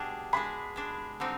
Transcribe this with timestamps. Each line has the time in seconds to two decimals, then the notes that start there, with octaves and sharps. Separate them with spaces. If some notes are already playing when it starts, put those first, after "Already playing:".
Already playing: B2 G3 D4 G#4
0.33 G#3 D4 G#4 B5
0.76 G#3 D4 G#4
1.20 D3 G3 C4 D#4